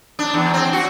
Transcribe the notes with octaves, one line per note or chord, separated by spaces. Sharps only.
D4
E2
C4
F#4